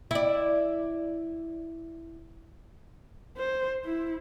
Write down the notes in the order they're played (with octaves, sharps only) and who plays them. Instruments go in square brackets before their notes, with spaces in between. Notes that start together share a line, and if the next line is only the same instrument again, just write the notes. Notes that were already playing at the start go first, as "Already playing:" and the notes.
[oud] E4 D5
[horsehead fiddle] C5
E4